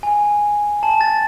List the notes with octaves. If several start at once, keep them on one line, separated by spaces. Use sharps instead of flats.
G#5
A5
A6